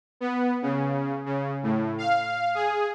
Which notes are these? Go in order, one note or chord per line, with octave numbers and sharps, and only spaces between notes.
B3
C#3
C#3
A2
F5
G#4